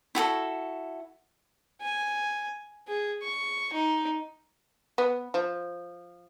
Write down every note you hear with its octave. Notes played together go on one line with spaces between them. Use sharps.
E4 F#4 G#4 A4
G#5
G#4
C#6
D#4
B3
F3